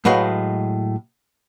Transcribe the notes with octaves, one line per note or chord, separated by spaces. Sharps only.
A2 F#3 G#3 B4 D#5 F5